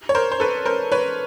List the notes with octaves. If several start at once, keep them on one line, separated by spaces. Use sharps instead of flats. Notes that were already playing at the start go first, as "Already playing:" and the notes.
C#5
A#4 C5
C5
A4 B4
A#4 C5
B4 C#5